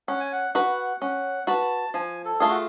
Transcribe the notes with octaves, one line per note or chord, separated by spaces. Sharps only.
C#4 F#5
G#5
F#5
F#4 B4 F#5
C#4 F#5
F#4 B4 A5
F3 G#5
A4
A3 F4 G#4
F#4